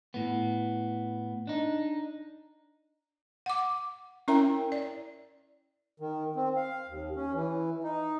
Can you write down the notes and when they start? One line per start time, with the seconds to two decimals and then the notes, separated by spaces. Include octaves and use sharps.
0.14 A2 B3
1.47 D4 D#4
3.46 F#5 D6
4.28 C#4 E4 A#4 E5 G5 A#5
4.72 D5
6.00 D#3
6.36 C4
6.56 F5
6.88 D#2
7.16 C#4
7.34 E3
7.84 D#4